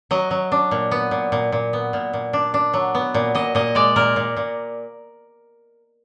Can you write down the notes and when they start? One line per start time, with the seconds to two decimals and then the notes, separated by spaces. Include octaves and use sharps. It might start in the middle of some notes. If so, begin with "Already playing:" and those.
0.11 F#3 D#5
0.31 F#3
0.52 D4
0.71 A#2
0.91 B3
1.11 A#2
1.32 A#2
1.52 A#2
1.73 B3
1.93 A#2
2.13 A#2
2.33 D4
2.54 D4
2.73 F#3
2.95 B3
3.14 A#2
3.35 A#2 D#5
3.55 A#2 D#5
3.75 G#3 D5
3.96 A#2 A#4
4.16 A#2
4.37 A#2